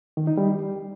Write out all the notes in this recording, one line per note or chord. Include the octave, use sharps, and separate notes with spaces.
D#3
D#4
G3